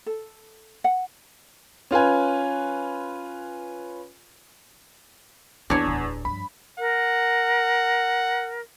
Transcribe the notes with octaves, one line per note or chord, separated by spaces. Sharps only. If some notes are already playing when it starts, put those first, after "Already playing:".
A4
F#5
C#4 F4 B4 G#5
E2 E3 A#3 D4 C#5
D1 A1
G2 F3 B5
A#4 F#5